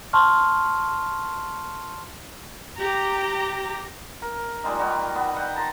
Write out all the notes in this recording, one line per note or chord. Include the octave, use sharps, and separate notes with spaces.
A5 C6 C#6 F6
G4 A#5
A#4
A#2 G3 G#3 D#4
D#3 G3 F#4
B3
F#5 G5
A5 A#5 C6